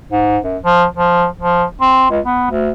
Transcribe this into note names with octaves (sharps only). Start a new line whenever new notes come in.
G#2
F#2
F3
F3
F3
C4
C#2
B3
D2